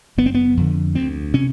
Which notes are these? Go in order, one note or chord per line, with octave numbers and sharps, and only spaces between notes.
F#1 B3
C4
B3
F2 D3
D2 C4
C3 C#4